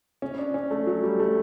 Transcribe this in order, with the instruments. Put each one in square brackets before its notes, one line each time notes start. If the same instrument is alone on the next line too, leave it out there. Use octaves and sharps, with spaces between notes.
[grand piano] C#4
D4
C#4
A3
F#3
G3
A3